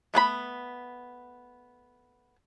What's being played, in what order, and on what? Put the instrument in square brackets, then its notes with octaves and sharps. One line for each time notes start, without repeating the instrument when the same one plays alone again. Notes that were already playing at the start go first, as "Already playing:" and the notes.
[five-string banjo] A3 B3 G#4 B5